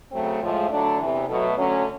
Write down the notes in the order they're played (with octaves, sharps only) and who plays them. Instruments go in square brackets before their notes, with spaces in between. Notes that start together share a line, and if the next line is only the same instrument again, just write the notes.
[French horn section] C#3 F#3 A3 C4
A2 F3 G#3
D3 F#3 A3 D4
E2 C3 E3
B2 F#3 A3
D3 F#3 A3 C#4